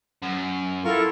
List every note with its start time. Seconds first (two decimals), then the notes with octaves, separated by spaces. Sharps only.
0.23 F#2
0.85 E4 F4 A4 A#4 F5 C#6